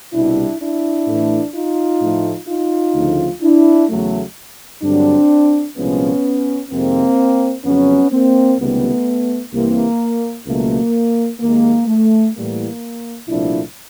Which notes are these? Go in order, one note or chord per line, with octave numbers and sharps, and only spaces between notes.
C2 B2 G3 D4 E4
D4 E4
A2 E3 A3
D#4 F4
A2 F3 A3
D#4 F4
D2 C#3 F3 A3
D4 E4
E2 C#3 F#3 A3
G2 D3 F#3 C4 D4
C2 A#2 F3 G#3 B3 C#4
F2 C3 D#3 G#3 A#3 C4
F2 C#3 F#3 B3 C#4
A#3 C4
C#2 C3 D#3 G3 A3 B3
C2 C3 E3 A#3
C#2 B2 F#3 A3 A#3
D#2 D#3 G#3 A#3
A3
A2 E3 G3 A#3
C2 A#2 F3 A3 D4 E4